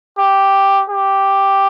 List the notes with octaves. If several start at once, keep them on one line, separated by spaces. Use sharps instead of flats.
G4
G4